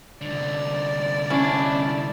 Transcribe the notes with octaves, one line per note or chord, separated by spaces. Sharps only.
C2 D3 D5
C#4 D4 E4